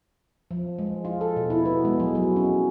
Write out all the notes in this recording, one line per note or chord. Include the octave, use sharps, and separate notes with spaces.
F3
G#3
F4
A4
B2
E4
B3
G#3
F#3
F#3
C#4